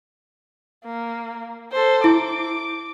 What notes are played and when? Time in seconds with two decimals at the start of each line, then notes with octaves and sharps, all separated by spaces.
0.85 A#3
1.72 A4 C5
2.04 E4 D6